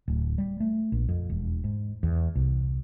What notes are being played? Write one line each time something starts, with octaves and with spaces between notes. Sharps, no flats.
D1
G3
A3
A#1
F2
E1
G#2
E2
C2